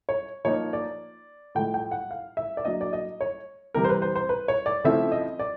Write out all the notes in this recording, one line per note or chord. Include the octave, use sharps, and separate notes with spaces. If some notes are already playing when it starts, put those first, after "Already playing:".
C#5
F3 A#3 D#4 C#5
D5
A2 F3 G#3 G5
G5
F#5
F5
E5
D5
F#3 A#3 D4 D#5
D5
D#5
C#5
C3 E3 G3 A#4
C5
B4
C5
C5
B4
C#5
D5
C#3 F3 A3 C4 E4 E5
D#5
D5